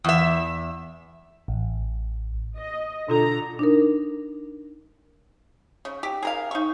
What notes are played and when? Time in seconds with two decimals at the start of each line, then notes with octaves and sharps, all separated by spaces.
0.04 E2 E5
1.48 A1
2.58 D#5
3.09 B2 D3 F4 A4 A#5
3.59 D4 D#4 A#4
5.85 C#3
6.03 G4
6.23 G#4 A#4 F5
6.51 D#4 C#6